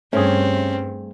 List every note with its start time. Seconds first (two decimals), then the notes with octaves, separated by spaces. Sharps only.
0.13 G2 A3 C4 C#4 G#4